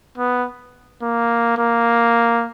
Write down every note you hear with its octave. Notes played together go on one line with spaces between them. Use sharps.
B3
A#3
A#3